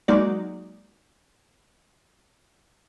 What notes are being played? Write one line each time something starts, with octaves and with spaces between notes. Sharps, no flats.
F#3 G#3 A#3 D#4 F#4 D5